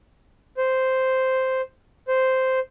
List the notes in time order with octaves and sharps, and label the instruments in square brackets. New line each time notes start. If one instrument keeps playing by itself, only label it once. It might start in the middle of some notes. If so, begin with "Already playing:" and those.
[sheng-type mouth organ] C5
C5